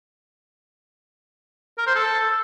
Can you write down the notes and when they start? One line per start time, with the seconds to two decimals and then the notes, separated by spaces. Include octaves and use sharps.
1.78 A#4
1.87 C5
1.95 A4